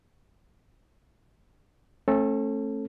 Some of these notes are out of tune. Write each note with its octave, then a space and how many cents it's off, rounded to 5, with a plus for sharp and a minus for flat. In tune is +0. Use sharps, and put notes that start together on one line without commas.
A3 +0 C#4 -40 A4 +0